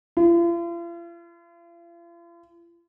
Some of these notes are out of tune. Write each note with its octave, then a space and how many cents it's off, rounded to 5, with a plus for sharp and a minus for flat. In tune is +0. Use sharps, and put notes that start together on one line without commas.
F4 -45